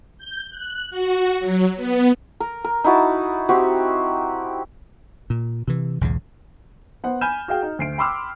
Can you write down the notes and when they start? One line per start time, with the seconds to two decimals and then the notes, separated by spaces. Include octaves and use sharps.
0.18 G6
0.50 F#6
0.91 F#4
1.40 F#3
1.77 B3
2.40 A#4
2.64 A#4
2.84 D#4 E4 F#4 A5
3.49 C4 F#4 G4
5.30 A#2
5.68 C3 E3
6.01 B1 E2 G#2 C#3
7.04 B3 C5 F#5
7.21 G#5 B5 F6 G6 E7
7.48 F#4 G#4 F5 G5
7.63 D#4
7.79 D2 C7 D7
7.98 G5 B5 C6 D6 E6 F6